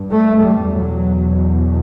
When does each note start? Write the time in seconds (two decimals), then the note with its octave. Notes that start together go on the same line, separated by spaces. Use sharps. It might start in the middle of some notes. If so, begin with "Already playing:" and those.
Already playing: G2
0.11 A3
0.43 G3
0.73 E2 B2 F#3